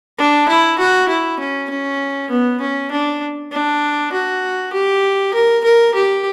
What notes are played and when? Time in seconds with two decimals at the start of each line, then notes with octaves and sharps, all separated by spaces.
0.18 D4
0.48 E4
0.79 F#4
1.09 E4
1.40 C#4
1.70 C#4
2.30 B3
2.61 C#4
2.91 D4
3.52 D4
4.12 F#4
4.73 G4
5.34 A#4
5.64 A#4
5.94 G4